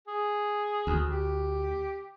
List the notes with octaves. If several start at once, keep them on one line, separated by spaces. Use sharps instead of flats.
G#4
D2
G4